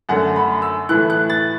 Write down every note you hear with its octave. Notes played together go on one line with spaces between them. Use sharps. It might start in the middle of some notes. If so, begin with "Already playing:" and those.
F#2 D3 A3 F#5
B5
E6
A2 E3 A3 F#6
F#6
A6